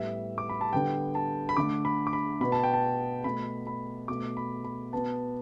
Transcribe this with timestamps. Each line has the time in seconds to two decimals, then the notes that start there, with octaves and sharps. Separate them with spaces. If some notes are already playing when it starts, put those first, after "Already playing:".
Already playing: A2 G3 B3 E5
0.38 D6
0.49 B5
0.61 A5
0.73 D3 G3 B3 G5
1.15 A5
1.49 B5
1.57 D3 A3 D6
1.85 B5
2.07 D6
2.13 B5
2.41 B2 B3 B5
2.52 A5
2.63 G5
2.74 A5
3.24 B2 A3 B5
3.67 B5
4.08 B2 A3 D6
4.37 B5
4.64 B5
4.93 B2 B3 A5